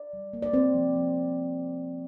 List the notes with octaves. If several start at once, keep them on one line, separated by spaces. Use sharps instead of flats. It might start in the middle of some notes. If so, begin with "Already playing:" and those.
Already playing: D5
G3
A#3
D5
C4 C5
F3
F3